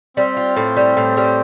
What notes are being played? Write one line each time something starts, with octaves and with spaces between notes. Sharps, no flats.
G3 C4
F4
A2
G3
A2
G3